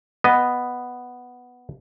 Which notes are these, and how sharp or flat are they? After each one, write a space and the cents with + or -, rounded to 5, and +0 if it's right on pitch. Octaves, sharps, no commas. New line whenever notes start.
B3 +0 D#5 +0